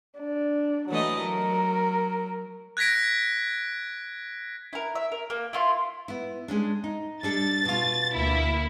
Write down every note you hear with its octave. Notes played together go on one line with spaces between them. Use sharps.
D4
E3 F#3 A3 D#5
F#3 A#4
F#6 G#6 A#6 B6 D7
E4 A#4
E5
A#4
A#3
E4 F4 C6
B3 E4
G#3 C#4 D4
D#4
G3 D4 A4 A6
B2 F4
D2 A#3 E4